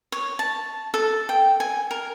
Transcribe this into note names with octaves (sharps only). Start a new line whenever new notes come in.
C#5
A5
A4
G5
G#5
A#4